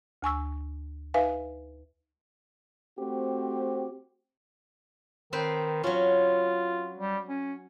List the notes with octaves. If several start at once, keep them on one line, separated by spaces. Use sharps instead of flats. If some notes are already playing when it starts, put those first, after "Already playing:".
D2 G#5 C#6 E6
D#4 B4 E5 F5 G#5
A3 C4 F#4 G4 C5
D#3 C4 B4 C5
F#3 C#4 F4
G3
C#4